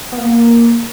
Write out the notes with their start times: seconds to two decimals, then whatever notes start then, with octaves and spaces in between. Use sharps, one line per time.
0.12 B3
0.18 A#3